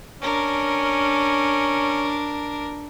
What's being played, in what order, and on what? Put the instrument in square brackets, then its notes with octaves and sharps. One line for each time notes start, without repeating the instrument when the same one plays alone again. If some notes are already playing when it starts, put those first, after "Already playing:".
[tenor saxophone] C#4 [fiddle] D4 A#4